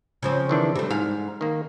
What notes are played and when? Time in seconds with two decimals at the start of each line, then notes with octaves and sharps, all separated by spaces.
0.23 C#3 F3 C4
0.49 D#3 E3 D4
0.76 C3 G3 A3
0.91 G#2 F5
1.41 D#3 A#3